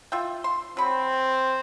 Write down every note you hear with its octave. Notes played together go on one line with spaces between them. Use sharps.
F4 E5 G5
C6
F#3 C4 B5